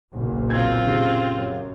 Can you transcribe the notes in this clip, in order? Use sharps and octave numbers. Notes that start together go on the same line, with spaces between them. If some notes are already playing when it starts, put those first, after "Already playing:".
F#1 B1 A#2
C4 F4 G#6
C#3 G4
F#2